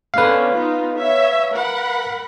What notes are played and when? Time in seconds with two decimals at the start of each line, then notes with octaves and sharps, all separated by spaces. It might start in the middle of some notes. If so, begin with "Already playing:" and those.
0.14 D3 B3 C#4 B4 F5
0.55 B3 D#4 F4
0.97 C#5 E5
1.53 A#4 F#5 B5